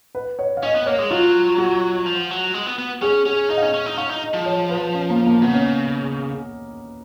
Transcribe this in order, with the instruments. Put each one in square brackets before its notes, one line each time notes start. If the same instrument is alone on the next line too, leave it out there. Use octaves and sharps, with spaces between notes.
[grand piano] B4
C#5
F5
[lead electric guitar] C#4 [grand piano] D#5
[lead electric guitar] B3
[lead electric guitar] A#3 [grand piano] C#5
[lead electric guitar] G#3
[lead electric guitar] F#3 [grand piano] F4
[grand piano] F#4
[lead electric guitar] F3
F#3
G#3
B3
B3
[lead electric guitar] C#4 [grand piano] G#4
[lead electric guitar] C#4 [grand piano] G#4
[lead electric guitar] D#4 [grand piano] D#5
[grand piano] F5
[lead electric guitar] C#4 [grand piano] D#5
[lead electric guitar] C#4
D#4
[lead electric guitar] C#4 [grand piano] F5
[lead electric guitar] D#4
[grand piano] D#5
[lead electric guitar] F3
[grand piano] C#5
B4
C#4
A#3
A#3
[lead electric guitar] C#3 [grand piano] B3
[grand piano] C#4